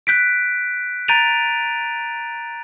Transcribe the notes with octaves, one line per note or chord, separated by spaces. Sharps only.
F#6 G6 B6 D7
A#5 G6 A6 D7 D#7 F7